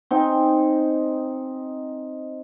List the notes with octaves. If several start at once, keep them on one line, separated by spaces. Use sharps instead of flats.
C4 D#4 G5 G#5